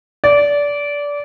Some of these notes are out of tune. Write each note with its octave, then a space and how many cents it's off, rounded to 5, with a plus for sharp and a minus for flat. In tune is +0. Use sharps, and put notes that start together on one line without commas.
D5 -20